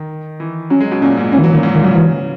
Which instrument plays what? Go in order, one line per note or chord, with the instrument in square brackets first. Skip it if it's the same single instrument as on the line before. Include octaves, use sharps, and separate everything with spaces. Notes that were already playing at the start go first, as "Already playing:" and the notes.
Already playing: [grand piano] D#3
E3
[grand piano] F#3 [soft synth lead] C#4
[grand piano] G#3
B2
[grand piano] A#2 [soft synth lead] C#4
[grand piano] G#2
[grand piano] E3 [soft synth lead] C#4
[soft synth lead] D#3
[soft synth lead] E3 [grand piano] F#3
[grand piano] A#2 [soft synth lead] D#3
[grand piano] G#2
[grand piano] A#2 [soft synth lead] D#3
[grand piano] C#3 [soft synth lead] F#3
[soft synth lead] E3